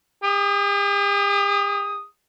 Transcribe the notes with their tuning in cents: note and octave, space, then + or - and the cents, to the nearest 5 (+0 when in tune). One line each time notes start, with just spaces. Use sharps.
G4 +45 D#6 +0